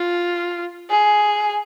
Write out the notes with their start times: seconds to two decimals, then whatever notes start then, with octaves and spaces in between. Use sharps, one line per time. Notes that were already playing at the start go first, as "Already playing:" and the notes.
Already playing: F4
0.90 G#4